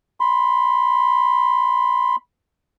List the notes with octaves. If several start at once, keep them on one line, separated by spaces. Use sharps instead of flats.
B5 C6